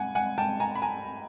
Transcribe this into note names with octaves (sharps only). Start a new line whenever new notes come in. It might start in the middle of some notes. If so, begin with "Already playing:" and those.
Already playing: F#5 G#5
F#5 G#5
G5 A5
G#5 A#5
B5
G#5 A#5